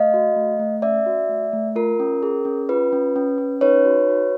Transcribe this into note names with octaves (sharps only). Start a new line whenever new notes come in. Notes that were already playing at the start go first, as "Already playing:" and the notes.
Already playing: A3 D#5 F5
F#4
A3
A3
C#4 D5 E5
F#4
A3
A3
F4 A#4
C#4
G#4
C#4
F4 B4
C#4
C#4
C#4
D#4 B4 C#5
F#4
F#4